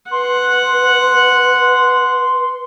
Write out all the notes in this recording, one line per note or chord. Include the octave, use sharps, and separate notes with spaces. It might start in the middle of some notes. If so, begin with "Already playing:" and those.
B4 F#5 C6